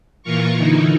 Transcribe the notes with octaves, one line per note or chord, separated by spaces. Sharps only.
A#2 E3 F4 A#4 C#6
D3 E3 D#4 E4